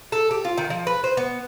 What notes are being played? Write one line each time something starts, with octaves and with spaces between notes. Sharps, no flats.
A4
G4
F4
D#3
F3
B4
C5
B3